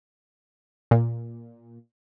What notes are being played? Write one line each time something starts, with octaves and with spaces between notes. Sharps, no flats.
A#2